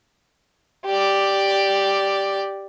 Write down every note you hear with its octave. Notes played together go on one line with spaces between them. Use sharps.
G4 D5